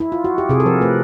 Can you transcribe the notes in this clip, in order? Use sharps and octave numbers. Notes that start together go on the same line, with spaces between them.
E4
F4
F#4
G4
C3 G#4
A4
F3 A#4
A3 B4